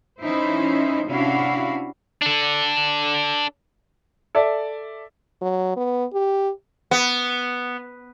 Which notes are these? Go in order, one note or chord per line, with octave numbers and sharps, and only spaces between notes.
E3 C#4 D#4 E4 C5
C3 C#4 D4 E4 F#4 F5
D4 A4
A4 D5 E5
F#3
B3
G4
B3